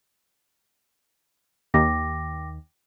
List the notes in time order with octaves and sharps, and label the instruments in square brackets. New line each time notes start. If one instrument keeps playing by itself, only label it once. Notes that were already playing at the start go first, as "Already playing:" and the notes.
[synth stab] D#2 [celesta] G5 D6 A#6